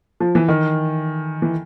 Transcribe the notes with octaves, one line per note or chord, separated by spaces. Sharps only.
F3
E3
D#3
E3